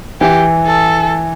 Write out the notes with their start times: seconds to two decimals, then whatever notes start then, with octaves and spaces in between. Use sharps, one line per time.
0.21 E3 G4
0.66 A4